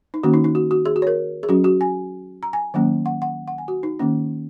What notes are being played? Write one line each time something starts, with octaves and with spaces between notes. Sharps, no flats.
D#4
D#3 A#3 C#4 F#4
D#4
D#4
F#4
F#4
G#4
F#4
C#5
A#4
G#4
F#3 C#4 F#4
F#4
G#5
A#5
G#5
D#3 F#3 A#3 C#4
F#5
F#5
F#5
G#5
F#4
D#4
D#3 A#3 C#4